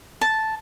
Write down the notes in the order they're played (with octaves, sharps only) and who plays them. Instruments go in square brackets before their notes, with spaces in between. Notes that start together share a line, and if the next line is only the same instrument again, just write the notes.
[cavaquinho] A5